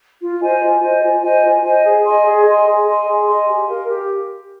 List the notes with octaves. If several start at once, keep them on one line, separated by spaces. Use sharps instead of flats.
F4
C5 D#5 G#5
F4
C5 D#5 G#5
F4
C5 D#5 G#5
F4
C5 D#5 G#5
G#4
D#5 G#5 C6
G#4
D#5 G#5 C6
G#4
D#5 G#5 C6
G#4
D#5 G#5 C6
G4
A#4 F5
G4